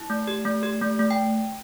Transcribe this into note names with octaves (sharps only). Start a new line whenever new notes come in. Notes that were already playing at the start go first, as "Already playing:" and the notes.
Already playing: E4
A3
G4
A3
G4
A3
A3
G5